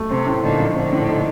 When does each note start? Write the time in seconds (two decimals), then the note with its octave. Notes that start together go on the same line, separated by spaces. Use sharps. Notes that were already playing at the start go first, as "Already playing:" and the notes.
Already playing: A3
0.10 C3 C4
0.26 A2
0.43 A#2 D3 D#4
0.59 F3
0.76 A#2 D3 C4
0.93 A2
1.08 D#4